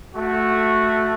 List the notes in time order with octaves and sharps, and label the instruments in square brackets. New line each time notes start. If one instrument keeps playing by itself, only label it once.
[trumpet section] A3 F#4